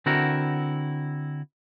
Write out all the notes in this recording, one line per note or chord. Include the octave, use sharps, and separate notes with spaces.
D3 C4 E4 F#4 A#4